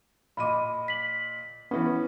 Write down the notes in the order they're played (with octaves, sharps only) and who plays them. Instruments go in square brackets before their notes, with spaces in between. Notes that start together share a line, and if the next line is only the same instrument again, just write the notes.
[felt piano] A#2 D#5 D#7 [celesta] B5 D6
[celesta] B6 F#7
[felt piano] E3 C#4 [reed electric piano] B3